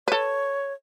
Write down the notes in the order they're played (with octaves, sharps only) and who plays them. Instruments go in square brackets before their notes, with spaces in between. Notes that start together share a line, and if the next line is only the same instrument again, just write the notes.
[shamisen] A4 B4 [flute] C#5